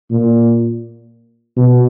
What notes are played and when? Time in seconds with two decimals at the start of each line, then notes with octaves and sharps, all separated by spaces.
0.11 A#2
1.57 B2